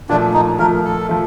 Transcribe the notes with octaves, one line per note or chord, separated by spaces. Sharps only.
A#2 F3 A3 D4
D#4
A#2 F3 A3 A#4
A4
F3 A3